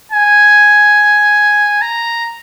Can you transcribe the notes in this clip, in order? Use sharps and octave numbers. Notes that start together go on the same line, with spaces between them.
G#5
A#5